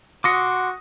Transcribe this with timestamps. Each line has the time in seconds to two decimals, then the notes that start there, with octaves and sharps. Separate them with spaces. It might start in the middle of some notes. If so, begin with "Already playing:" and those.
0.24 F#4 C6 D6 D#6 A#6 C#7